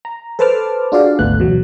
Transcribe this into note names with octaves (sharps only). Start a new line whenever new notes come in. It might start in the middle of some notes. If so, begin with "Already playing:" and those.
A#5
A4 B4 C5 A5 D6 F6
D4 F4 F#4 G#4 D5 F5
G#1 D2 A3 B3 F#6
E2 B2 F#3